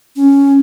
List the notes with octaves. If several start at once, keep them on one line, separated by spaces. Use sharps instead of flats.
C#4